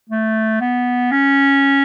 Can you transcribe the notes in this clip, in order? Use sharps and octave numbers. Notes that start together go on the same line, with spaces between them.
A3
B3
C#4